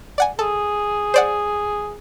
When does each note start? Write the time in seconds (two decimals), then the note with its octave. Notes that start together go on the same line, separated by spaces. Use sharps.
0.18 D5 F#5 G#5
0.39 G#4 A4
1.14 C5 D5 F#5